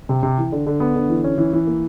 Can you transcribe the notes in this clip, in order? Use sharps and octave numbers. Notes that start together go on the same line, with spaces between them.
C3
C3
E3
D3
D3
B3
D3
E3
C#4
E3
E3
A#3